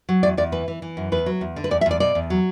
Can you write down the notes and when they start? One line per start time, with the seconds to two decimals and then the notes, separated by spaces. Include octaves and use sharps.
0.09 F#3
0.23 E2 D5
0.37 E2 D5
0.52 E3 B4
0.68 E3
0.82 E3
0.97 F#2
1.12 E2 B4
1.26 F#3
1.41 E2
1.56 D3
1.64 B4
1.71 E2 D5
1.81 E5
1.86 E2 D5
2.00 B2 D5
2.15 E2
2.30 F#3